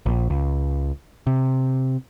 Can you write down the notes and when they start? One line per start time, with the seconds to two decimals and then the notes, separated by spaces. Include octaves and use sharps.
0.06 A#1
0.30 C#2
1.27 C3